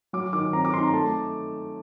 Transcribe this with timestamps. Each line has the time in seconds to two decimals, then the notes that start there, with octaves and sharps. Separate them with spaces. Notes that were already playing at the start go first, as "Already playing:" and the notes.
0.13 F#3 D6
0.33 D#3 D6
0.53 C4 A#5
0.65 D6
0.73 D#4 C6
0.83 A#5
0.93 A3 A5